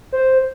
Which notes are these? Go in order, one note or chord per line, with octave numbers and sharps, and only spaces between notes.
C5